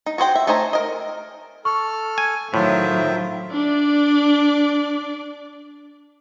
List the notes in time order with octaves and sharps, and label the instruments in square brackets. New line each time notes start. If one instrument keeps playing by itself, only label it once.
[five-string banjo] D#4
F#4 G#4 C5 G5
E5
A3 D#4 C5 G#5 A#5
A#4 D#5
[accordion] A4 F6 [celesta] C#6
[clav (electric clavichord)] G#5
[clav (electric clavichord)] A2 [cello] D#3 F#3 [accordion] F4 C5 E5
[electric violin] D4 D5